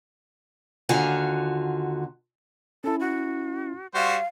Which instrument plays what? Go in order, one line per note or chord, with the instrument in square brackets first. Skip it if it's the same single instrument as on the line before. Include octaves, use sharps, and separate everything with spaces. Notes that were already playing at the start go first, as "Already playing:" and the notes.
[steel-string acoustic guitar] D#2 D3 F4 F#4 G#5
[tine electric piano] C#4 E4 [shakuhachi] A4
[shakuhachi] F#4
[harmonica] G3 F#4 C5 [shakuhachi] F5